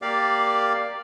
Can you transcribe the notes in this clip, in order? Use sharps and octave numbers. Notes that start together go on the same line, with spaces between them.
A#3 G4 D5 F5